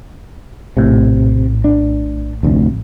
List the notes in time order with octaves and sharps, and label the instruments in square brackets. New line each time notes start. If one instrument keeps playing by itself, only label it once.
[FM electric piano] A#1 A2 [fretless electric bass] C3
[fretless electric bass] D4
F1 D2